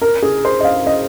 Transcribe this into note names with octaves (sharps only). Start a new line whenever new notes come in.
A#4
G#4
C5
D#5
F5
D#5